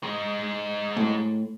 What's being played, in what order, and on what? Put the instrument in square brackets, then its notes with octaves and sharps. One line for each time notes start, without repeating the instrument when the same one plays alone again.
[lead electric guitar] G#3 D#4
[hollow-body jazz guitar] A2